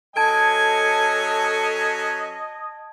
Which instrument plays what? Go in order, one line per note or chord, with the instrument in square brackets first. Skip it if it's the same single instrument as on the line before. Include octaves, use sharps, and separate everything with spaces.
[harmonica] F#3 C#4 G#5 [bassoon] A4 [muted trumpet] D#5 [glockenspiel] A5 G#6 D7